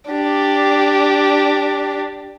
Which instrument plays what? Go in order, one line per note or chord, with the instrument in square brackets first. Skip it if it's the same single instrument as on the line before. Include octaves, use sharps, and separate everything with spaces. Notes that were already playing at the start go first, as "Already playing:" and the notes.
[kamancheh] D4 G4